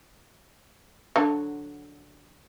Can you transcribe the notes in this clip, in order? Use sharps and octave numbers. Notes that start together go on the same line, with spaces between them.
D3 F#3